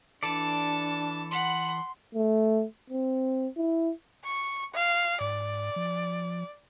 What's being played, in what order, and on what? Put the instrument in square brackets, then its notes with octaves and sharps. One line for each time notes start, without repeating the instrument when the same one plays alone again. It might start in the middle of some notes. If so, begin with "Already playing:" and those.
[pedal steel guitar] E3 A4 D5 [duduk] D4 [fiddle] A5
[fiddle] F#5 B5 [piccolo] C6
[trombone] A3
C4
E4
[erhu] C#6
F5
[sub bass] G#2 [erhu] D5
[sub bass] F3